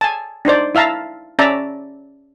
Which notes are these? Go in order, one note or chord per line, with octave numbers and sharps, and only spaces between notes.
G#5 A5
D4 D#4 C5 D5
E4 E5 F5 A5 A#5
C#4 D5 E5 A5 A#5